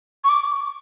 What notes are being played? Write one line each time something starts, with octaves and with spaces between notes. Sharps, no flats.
C#6
D6